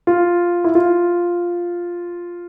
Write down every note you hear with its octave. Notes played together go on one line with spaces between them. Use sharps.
F4
E4
F4